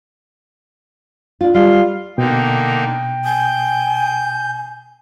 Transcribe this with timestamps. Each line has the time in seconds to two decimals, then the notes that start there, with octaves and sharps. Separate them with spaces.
1.41 D4 F4
1.54 G3 F4
2.18 B2 D3 A#3 D#4 G5
3.25 G#5 G6